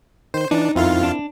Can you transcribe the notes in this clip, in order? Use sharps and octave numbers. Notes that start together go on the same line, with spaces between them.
D#3 C5
E3 D4 D#4
F2 C4 E4 F4 A#4 F5
D4